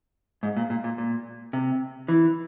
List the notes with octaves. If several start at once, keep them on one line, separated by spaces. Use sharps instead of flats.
G#2
A#2
A#2
A#2
A#2
C3
E3